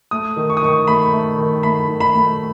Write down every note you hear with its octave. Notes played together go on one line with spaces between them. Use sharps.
A3 D#6
D#3
C#6
D#6
D#3 C#6
A3 B5
A3
D#3
A3 B5
D#3
B5
A3